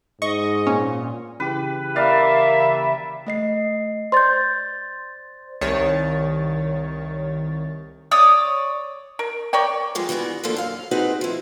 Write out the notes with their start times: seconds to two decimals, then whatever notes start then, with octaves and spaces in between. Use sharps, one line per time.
0.22 G#2 D#5 C#6
0.67 A#2 C#4
1.40 C#3 E3 G4 B4
1.96 G3 A#3 D5 E5 F5
3.27 A3 D#5 C7
4.12 C5 D5 C6 G6 A6
5.61 C2 D#3 C#5 A6
8.11 C#5 D5 D#6
9.19 A#4
9.53 A#4 C#5 D5 G5
9.95 F3 G3 G#3 B3 G#4
10.09 E3 G3 B3 F#4 G#4
10.43 D2 D3 F3 A#3 D4 A4
10.56 F#2 F5
10.91 C4 D#4 F#4 G#4 B4 C5
11.21 F3 E4